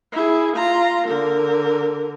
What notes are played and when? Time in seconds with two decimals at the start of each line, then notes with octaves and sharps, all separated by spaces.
0.13 E4 G#4
0.56 F4 A#5
1.07 D3 A#4